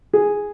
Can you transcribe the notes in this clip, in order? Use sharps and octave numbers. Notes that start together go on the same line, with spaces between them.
G#4